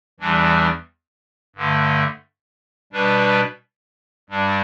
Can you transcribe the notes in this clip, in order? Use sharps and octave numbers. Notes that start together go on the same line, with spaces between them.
E2 E3 G3 D4
G2 D3 A3
B2 G3 D4 B4
G2 G3 D4